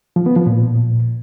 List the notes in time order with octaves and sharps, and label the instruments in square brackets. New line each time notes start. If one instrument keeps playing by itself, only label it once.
[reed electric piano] F3
B3
F3
A#2